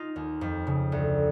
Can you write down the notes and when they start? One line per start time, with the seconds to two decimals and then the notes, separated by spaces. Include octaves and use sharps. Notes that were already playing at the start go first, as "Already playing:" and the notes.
Already playing: D#4 F4
0.16 D#2
0.41 F2
0.67 C#3
0.92 D2